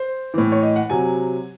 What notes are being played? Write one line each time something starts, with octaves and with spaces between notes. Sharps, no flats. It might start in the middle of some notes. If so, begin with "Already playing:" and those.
Already playing: C5
A2 E3
C#5
D#5
F#5
C3 F#3 G#5